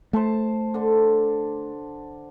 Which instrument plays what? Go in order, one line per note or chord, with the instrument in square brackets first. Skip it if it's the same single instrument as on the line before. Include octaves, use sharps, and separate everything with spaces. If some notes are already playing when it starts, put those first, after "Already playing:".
[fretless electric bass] A3 [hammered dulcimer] C5 A5
[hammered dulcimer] D3 D4